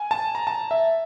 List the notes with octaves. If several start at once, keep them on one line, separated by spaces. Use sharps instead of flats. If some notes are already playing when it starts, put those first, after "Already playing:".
Already playing: G#5
A5
A#5
A5
E5